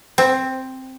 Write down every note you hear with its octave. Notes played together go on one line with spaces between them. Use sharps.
C4